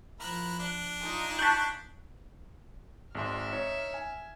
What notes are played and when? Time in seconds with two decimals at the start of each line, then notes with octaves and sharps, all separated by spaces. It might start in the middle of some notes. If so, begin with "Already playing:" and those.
0.20 F3 E4 A#4 F#6
0.59 D4
0.99 D#4 F4 G#5
1.39 A5 C#6 F#6 G6 B6
3.15 G#1 G#3 E5 C6 F6
3.52 D#4 C#5
3.94 G#5